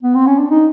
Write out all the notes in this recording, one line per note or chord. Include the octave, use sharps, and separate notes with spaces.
B3
C4
C#4
D4
D#4